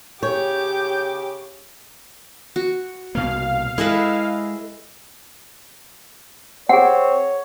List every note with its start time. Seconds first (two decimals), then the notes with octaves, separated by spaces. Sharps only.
0.23 C#3 G4 C#5 D6 G6
2.56 F#4
3.15 C2 B2 A#3 F5
3.78 G#3 E4 G#4 A4 B4 D#5
6.69 C4 G#4 C#5 F#5